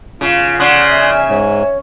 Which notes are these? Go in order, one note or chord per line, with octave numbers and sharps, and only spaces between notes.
C#3 F4 F5
C#3 D5 F#5 C6 D#6 F#6
E5 G#5
G#2 C#5